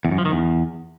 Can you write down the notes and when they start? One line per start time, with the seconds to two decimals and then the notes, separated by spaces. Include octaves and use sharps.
0.05 E2
0.11 F#2
0.18 F3
0.25 D#3
0.32 E2